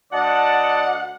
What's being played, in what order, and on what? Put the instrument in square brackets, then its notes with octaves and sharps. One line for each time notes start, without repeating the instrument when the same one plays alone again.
[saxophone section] D2 F#5 [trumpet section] D5 D#5 A5